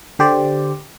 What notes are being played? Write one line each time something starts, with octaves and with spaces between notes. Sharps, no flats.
D3 G4 C5 D5